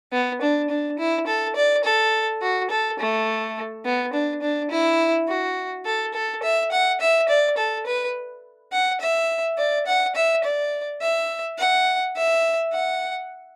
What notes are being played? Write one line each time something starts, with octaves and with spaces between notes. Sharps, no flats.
B3
D4
D4
E4
A4
D5
A4
F#4
A4
A3
B3
D4
D4
E4
F#4
A4
A4
E5
F#5
E5
D5
A4
B4
F#5
E5
D5
F#5
E5
D5
E5
F#5
E5
F#5